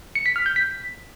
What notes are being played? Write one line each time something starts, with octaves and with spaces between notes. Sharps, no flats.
C#7
B6
F6
G6
B6